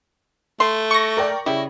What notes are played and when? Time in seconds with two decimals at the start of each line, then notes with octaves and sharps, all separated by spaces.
0.60 A3 C6
0.91 C#6 A#6
1.17 A#4 D5 G5
1.46 C#3 G3 E4